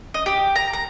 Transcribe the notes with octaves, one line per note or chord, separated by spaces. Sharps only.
D#5
G4
A#5
A#5